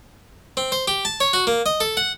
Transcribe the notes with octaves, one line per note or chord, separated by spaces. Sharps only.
C4
C5
G4
A5
C#5
F#4
A#3
D#5
A4
F#5